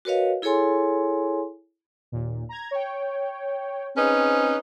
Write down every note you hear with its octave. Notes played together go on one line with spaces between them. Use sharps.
F#4 A#4 B4 C#5 D#5 F5
E4 G#4 A4 C#5 G#5 C6
D#2 A#2
A#5 G#6
C#5 G5
C4 C#4 D#4 G#4 B4